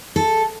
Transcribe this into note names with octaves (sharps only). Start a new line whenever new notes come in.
A4